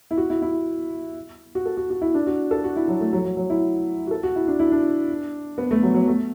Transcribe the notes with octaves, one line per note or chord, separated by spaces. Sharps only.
E4
F#4
E4
E4
F#4
A4
F#4
F#4
E4
D4
F#4
A4
F#4
E4
F#3
A3
F#3
F#3
F#3
E4
F#4
A4
F#4
E4
D4
E4
D4
B3
A3
F#3
F#3
A3